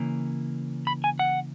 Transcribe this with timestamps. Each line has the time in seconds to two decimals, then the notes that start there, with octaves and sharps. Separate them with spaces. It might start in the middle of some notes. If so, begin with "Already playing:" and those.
Already playing: C#3 E3 A#3
0.87 B5
1.04 G#5
1.19 F#5